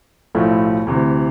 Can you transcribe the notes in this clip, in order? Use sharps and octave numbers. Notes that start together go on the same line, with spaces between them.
B1 A2 F3 A3 E4
D2 C3 E3